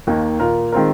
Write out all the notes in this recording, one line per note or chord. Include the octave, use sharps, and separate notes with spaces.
D#2 D#3 A#3
A#2 A#3 F4 A#4
D#3 G#3 C4 F4 A#4